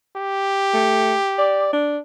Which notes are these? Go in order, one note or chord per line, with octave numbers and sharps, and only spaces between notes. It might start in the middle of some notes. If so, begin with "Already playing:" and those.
G4
A3
D5
D4